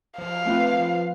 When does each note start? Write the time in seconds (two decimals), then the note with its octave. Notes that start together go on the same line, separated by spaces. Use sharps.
0.18 F3 F5
0.45 A3 C4 F4 B4
0.73 F3